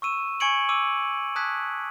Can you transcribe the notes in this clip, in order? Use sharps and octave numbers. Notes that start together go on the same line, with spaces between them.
C#6 E6 D#7 E7
G#5 C#6 G#6 C#7 D7 F#7
C#6 D6 E6 D#7
A5 D#6 F#6 G#6 B6